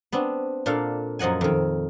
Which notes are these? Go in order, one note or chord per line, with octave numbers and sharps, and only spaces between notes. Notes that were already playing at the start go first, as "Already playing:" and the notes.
B3 C4 D4
A#2 D4 A4 F5
F#2 F3 D#5 F#5 G#5
F2 D#3